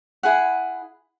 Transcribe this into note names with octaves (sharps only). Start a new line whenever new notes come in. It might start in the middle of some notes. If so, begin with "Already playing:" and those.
E4 G#4 F#5